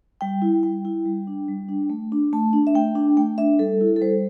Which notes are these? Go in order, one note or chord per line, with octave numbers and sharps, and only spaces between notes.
G3 G5
E4
G3 G5
E4
G3
D4
G3
D4
A3
D4
A3 A5
D4
E5
A3 G5
D4
A3 G5
D4 E5
G3 A4
E4
A4
G3 C5